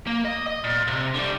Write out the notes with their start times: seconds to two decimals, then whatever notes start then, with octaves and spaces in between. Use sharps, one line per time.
0.07 A#3
0.25 D#5
0.47 D#5
0.64 A#2
0.88 C3
1.15 D3 G3